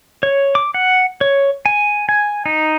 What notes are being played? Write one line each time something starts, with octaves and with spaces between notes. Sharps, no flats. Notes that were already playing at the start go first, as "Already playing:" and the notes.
C#5
D6
F#5
C#5
G#5
G#5
D#4